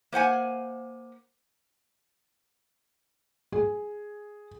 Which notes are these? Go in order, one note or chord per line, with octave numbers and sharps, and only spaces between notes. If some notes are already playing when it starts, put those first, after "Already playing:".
A#3 C5 F#5 G#5
G#4